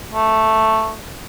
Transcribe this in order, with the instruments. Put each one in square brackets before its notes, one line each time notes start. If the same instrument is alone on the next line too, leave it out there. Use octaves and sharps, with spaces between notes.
[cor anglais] A3